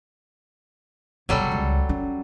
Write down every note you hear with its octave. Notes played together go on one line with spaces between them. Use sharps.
C#3 F#3 G3 B3 A4
C#2
C#4